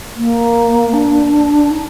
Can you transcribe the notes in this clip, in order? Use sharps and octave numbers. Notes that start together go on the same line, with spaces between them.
A#3
D4
D#4